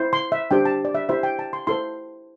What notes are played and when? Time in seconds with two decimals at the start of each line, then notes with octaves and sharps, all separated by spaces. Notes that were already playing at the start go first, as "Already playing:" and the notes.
Already playing: E4 C5
0.13 C6
0.32 E5
0.51 D4 G4 C5 G5
0.65 A5
0.85 D5
0.95 E5
1.09 E4 G4 C5 E5
1.23 G5
1.39 A5
1.53 C6
1.67 E4 A4 C5 C6